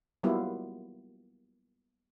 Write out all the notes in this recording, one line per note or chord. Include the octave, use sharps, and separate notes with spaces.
F#3 G3 A#3 B3 E4 F4